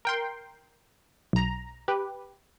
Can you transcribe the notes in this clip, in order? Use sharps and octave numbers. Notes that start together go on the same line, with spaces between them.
A#4 G5 C6
B1 A#5
G4 B4